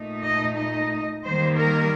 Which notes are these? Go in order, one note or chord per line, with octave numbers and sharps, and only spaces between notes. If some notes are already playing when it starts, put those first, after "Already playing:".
Already playing: A#2 A3 D#4
D#5
D#5
D#3 G3 A#3 C5
A#4